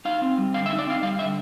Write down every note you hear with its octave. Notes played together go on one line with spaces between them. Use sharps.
D#4 F5
C4
G3
D3 F5
E5
D#4
D5
C4 F5
G3 F5
D3 E5